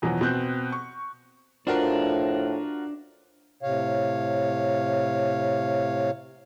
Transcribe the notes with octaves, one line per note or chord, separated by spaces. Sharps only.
E2 B2 F3 F#3
B2 C4 F#6 G6
C#6
A2 F3 D4 F4 F#4 A#4
A2 C3 C#5 F5